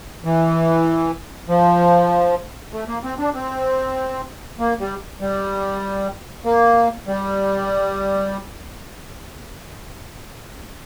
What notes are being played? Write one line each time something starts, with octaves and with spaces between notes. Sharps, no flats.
E3
F3
A3
A#3
C4
D4
C4
A#3
G3
G3
A#3
G3